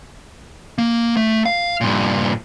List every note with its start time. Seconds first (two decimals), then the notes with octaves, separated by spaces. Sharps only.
0.78 A#3
1.17 A3
1.46 F5
1.81 G2 A#2